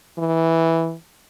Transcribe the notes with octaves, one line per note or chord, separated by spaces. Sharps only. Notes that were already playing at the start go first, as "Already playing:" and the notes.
E3